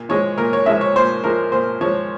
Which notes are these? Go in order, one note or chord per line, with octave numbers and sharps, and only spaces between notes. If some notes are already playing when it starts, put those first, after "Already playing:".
Already playing: A#2
F3 G#3 C#5
A#2 A#4
C#5
F3 G#3 E5
C#5
A#2 C5
F3 G#3 A#4
A#2 C5
F3 G#3 C#5